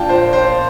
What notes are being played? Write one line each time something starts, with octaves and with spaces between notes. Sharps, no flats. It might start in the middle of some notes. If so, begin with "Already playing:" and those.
Already playing: A#2 F3 D4 F5 G5 A5
C5
C5